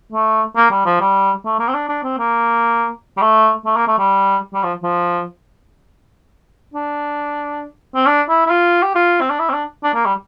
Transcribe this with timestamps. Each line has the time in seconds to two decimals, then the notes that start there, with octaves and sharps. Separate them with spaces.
0.12 A3
0.56 A#3
0.71 G3
0.86 F3
1.01 G3
1.45 A3
1.59 A#3
1.68 C4
1.74 D4
1.89 D4
2.04 C4
2.18 A#3
3.17 G3
3.21 A3
3.65 A3
3.76 A#3
3.87 A3
3.99 G3
4.53 G3
4.63 F3
4.82 F3
6.74 D4
7.95 C4
8.07 D4
8.29 E4
8.46 E4
8.50 F4
8.83 G4
8.95 F4
9.21 C4
9.30 D4
9.39 E4
9.49 C4
9.53 D4
9.83 D4
9.94 A#3
10.05 G3